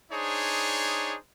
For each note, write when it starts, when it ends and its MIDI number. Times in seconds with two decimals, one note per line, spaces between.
0.12 1.15 62
0.12 1.15 63
0.12 1.15 68
0.12 1.15 72
0.12 1.15 73